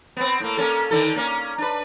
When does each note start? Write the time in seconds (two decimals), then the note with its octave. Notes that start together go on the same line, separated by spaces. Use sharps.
0.17 B3 C4
0.40 A2 A#3
0.57 A#3 C#4 A4
0.91 D3 D#3 A4
1.16 A#3 C#4
1.58 D4 B4